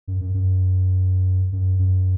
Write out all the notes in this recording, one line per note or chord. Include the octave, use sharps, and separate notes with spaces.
F#2
F#2
F#2
F#2
F#2